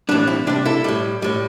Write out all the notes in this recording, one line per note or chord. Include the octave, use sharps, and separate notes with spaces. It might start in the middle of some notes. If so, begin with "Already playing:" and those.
A2 E3 G3 D4
C4 E4
C3 G3 D4 G4
E4 A4
A2 G3
A2 G3